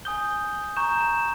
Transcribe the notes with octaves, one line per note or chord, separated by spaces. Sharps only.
G#5 D#6 G6 G7
A#5 C#6 G6 E7
E7